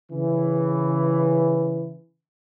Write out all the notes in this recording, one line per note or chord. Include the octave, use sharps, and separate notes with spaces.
C#3 E3